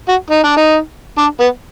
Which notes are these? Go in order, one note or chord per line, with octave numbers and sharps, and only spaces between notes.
F#4
D#4
D4
D#4
D4
B3